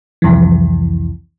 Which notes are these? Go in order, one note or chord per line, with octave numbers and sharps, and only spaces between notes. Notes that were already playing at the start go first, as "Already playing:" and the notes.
C2 F2 E3